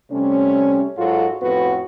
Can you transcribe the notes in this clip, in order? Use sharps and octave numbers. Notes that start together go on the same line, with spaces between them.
C3 G3 A3 C#4
G#2 F#3 F4 F#4 A4
F2 A2 B3 F#4 B4